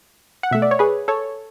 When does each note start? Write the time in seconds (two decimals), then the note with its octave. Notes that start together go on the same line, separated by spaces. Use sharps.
0.43 F#5
0.51 B2 A3 E5
0.62 D5
0.71 C#5
0.79 G#4 B4
1.08 A4 C#5